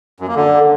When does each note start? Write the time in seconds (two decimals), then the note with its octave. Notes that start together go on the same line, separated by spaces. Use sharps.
0.20 F#2
0.28 A#3
0.35 D3